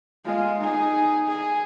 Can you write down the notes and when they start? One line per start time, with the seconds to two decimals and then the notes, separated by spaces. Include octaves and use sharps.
0.25 G#3 F4
0.60 D#4 G#4
1.27 G#4